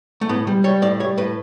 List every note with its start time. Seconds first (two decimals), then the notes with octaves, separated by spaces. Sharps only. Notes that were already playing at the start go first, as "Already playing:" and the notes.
0.21 A3
0.29 A2 B3
0.47 G3
0.64 G3 C#5
0.82 A2 D5
1.00 G3 C#5
1.18 A2 B4